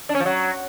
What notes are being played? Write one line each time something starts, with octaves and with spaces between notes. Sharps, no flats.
D4
C#4
F3
F#3